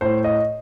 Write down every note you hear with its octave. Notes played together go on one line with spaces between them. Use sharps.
A2 C5
D#5